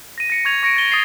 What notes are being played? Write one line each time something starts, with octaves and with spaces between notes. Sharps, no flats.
A#6 D#7
A#6 C#7 D#7
C#6 G#6 F7
C#6 A#6 C#7 D7
A6 G7
D#6 A6 C7